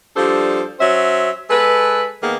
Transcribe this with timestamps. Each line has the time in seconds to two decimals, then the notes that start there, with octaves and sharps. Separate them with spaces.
0.17 F3 G3 D4 A4 C5
0.80 F#3 C#4 C5 E5
1.50 G#3 A4 B4
2.23 D#3 A#3 B3 G#4